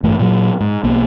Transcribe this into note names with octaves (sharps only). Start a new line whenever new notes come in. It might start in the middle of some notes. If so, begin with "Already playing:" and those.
A1 G2 E3 A3
A#2 F#3
G#2
B1 A#3